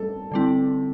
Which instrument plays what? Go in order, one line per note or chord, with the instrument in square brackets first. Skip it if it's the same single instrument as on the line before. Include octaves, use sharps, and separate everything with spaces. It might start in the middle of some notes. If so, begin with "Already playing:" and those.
Already playing: [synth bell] G3 [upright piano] A4
[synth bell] D3 G3 C4 E4